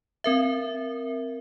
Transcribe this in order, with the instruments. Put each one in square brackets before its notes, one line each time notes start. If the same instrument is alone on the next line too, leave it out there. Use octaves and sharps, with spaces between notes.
[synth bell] C4 A#4 E5